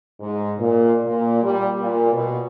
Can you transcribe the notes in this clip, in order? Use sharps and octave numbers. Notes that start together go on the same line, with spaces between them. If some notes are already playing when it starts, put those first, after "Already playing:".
G#2
A#2
A#2
G3
A#2
B2